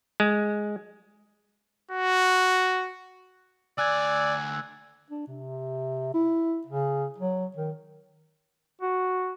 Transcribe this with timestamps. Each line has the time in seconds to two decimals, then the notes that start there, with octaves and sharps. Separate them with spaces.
0.20 G#3
1.91 F#4
3.78 D2 D5 G#5 E6 F#6 G#6
5.10 D4
5.27 C3
6.14 E4
6.67 C#3
7.18 F#3
7.56 D#3
8.82 F#4